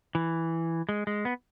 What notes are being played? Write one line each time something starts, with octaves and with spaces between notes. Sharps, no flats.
E3
G#3
G#3
B3